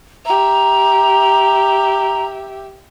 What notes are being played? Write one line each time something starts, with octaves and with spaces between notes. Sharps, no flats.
G4 E5 A#5